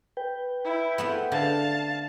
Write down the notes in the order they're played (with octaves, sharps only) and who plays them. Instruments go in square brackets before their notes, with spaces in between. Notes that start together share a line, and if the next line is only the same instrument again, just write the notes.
[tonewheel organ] B4 G5
[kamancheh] E4
[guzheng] A3 B3 C4
[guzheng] D3 [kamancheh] F5 A5